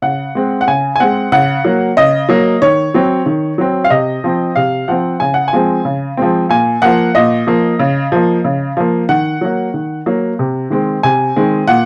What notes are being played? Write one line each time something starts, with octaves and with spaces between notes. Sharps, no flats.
C#3 F#5
G#3 C4
F#5
C#3 G#5
G#5
G#3 C4 F#5
C#3 F#5
F#3 A#3
C#3 D#5
F#3 A#3
D#3 C#5
F#3 C4
D#3
F#3 C4
F5
C3 D#5
F3 C4
C3 F5
F3 C4 F#5
C#3 G#5
F#5
G#5
F3 G#3 C4
C#3
F3 G#3 C4
A#2 G#5
F3 A#3 F#5
A#2 D#5
F3 A#3
C#3
F3 A#3
C#3
F3 A#3
D#3 F#5
F#3 A#3
D#3
F#3 A#3
C3
D#3 G#3 C4
C3 G#5
D#3 G#3 C4
A#2 F#5